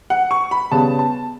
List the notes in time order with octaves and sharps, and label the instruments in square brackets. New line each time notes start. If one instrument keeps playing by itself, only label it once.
[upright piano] F#5
C#6
B5
C#3 G3 B3 A5
A5